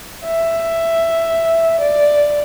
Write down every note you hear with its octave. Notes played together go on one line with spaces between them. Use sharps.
E5
D5